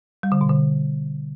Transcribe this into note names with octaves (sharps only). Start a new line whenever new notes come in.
G3
D3
B2
D3